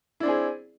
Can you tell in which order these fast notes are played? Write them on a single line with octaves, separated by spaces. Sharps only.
E4 D4 C4 G#4